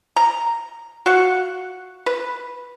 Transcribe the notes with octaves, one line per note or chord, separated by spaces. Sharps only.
A#5
F#4 F5 F#5
B4